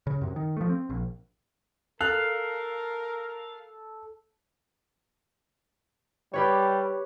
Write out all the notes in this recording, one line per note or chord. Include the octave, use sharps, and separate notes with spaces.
C#3
F#2 C3
D#3
F3 A3
C4
A#1
A4 A#4 F5 F#6
G3 G4 B4 C#5